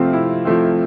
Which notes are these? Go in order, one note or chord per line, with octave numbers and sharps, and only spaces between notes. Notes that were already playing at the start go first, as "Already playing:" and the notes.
Already playing: C3 F3 A3 C4 F4
C3 E4
F3 A3 C4